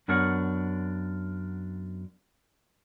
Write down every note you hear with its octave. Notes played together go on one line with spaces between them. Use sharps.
F#2 B3 D4 A#4 C#5 F#5